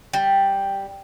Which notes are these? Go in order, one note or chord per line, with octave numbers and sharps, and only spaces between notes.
G3